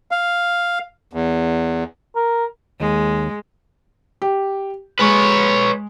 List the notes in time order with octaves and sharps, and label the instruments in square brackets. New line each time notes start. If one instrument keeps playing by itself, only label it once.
[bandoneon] F5
E2
[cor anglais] A#4
[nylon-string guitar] D#2 [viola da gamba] G#3
[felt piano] G4
[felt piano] G#3 [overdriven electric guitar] B4 C#5